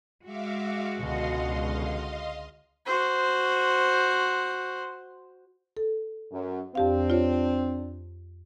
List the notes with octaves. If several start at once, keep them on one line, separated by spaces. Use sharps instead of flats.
G#3 F#4 E5 F5 D6
C#2 B2 D3 D#5 F5 C6
F#4 C5
A4
F#2
F2 C4 D4 G4 F5
F4 C#5